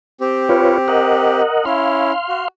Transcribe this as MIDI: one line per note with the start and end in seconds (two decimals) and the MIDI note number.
0.21 1.41 60
0.21 1.41 67
0.49 0.78 65
0.49 0.78 71
0.49 0.78 73
0.88 1.65 70
0.88 1.65 75
0.88 1.65 78
1.66 2.12 61
1.66 2.12 64
1.66 2.48 77
1.66 2.48 84
2.29 2.45 66